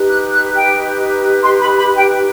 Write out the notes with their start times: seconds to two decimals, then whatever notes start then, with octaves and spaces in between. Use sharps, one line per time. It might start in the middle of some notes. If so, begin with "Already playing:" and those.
Already playing: D#4 G4 B4
0.09 F#6
0.32 F#6
0.56 G5
1.43 C6
1.60 B5
1.77 B5
1.96 G5